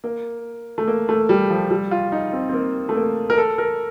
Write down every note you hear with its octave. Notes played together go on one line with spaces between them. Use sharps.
A#3
A3
A#3
A3
G3
F3
G3
F4
D#4
C4
C4
A#3
A3
A#3
A#4
A4
A#4